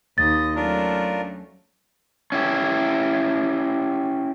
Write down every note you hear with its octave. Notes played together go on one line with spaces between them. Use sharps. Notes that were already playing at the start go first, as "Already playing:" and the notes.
D#2 D#5 D#6 A6
F#3 A3 C#4 D4 F4 A#4
C#4 E4 G4